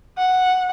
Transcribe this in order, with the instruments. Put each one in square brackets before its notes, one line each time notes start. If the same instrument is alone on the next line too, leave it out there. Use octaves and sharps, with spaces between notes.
[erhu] F#5